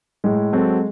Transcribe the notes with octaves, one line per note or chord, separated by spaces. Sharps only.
A2 G#3
F#3 C4 F#4 A4